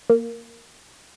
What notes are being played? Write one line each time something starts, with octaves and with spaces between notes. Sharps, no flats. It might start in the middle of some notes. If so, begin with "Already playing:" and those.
A#3